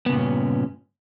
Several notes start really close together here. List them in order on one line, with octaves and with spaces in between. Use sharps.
B3 C#3 A#2 G2 C#4